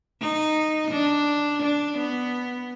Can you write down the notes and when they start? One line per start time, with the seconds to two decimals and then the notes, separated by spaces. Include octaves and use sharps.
0.21 D#4
0.91 D4
1.62 D4
1.98 B3